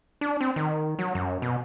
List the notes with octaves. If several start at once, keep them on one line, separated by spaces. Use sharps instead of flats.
D4
C4
D#3
F#3
F#2
B2